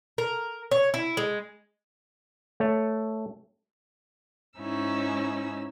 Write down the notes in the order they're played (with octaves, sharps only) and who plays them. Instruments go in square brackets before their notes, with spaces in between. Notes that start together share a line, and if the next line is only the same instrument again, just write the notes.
[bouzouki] A#4
C#5
E4
G#3
[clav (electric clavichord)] A3 C#5
[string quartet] G#2 C#4 D#4 E4 E6